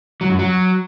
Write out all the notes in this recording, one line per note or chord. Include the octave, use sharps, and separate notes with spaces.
F#3
F#2
F#3